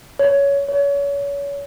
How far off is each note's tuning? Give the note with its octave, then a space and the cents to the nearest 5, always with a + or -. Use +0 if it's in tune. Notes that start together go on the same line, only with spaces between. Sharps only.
C#5 +15
C#5 +30